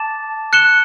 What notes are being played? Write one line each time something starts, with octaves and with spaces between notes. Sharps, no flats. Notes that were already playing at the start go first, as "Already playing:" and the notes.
Already playing: A5 D6 A6 E7
F#6 C#7 E7 G7